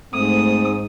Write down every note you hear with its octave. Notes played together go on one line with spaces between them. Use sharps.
G#2 A3 C4 D#6